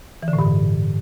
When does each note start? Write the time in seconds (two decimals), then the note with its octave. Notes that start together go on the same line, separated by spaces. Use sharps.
0.23 E3
0.28 D3
0.33 A2
0.39 G2